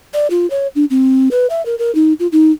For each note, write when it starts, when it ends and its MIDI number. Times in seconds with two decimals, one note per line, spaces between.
0.14 0.27 74
0.30 0.49 65
0.50 0.67 73
0.75 0.85 62
0.90 1.29 60
1.31 1.47 71
1.50 1.65 76
1.66 1.78 70
1.79 1.94 70
1.95 2.13 63
2.19 2.27 65
2.32 2.51 63